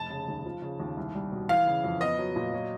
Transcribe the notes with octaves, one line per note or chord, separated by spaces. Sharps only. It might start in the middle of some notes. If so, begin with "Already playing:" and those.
Already playing: F1 A5
C#3
D#2
F3
C#3
D#2
C2
G3
B2
E3 F5
C#3
F2
B3 D#5
F#3
A#2
F#3